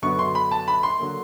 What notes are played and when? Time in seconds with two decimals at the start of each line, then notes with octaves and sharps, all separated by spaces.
0.02 F#2 D3 F#3 B3 C#6
0.19 C6
0.35 B5
0.51 A5
0.68 B5
0.83 C6
0.99 D3 F#3 A#3